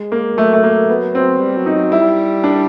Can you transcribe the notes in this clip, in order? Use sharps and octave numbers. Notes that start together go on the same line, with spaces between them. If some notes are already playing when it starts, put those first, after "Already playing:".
Already playing: G#3
A#3
F#3 A3
A3
A#3
B3
C4
G3
F#3
D#4
F#3
G3 E4
D4